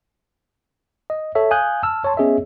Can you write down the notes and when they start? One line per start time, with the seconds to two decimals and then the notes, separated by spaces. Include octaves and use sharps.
1.10 D#5
1.35 A4 C#5 E5
1.51 F5 G#5 D#6 F#6 G6
1.83 A5 E6 F6
2.04 C#5 A5 C6
2.17 B3 C#4 G#4 C#5 D#5 E5